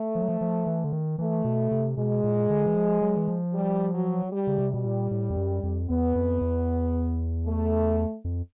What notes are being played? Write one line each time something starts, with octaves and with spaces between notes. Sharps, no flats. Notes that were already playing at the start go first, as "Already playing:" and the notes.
Already playing: A3
F3
F#3
F3
F3
E3
D3
D#3
E3 A3
B2
C3
B2 G#3
A#2
D3
E3
F3
F#3
E3
F3
G3
F#3
G3
C#3
C3
B2 G3
A#2
A2
F2
F#2
F2
E2 B3
F2
E2
A3
F2